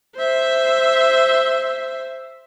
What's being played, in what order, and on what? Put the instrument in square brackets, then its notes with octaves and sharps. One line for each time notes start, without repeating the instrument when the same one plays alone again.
[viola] C5 E5